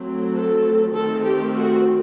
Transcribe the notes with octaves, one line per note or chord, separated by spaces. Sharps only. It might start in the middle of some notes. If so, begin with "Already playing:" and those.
Already playing: F#3 A3 C4
A4
D#3 A3 C4 A4
G4
F#4